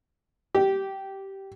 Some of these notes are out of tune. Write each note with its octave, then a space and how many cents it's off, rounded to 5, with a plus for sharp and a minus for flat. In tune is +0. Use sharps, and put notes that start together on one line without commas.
G4 -15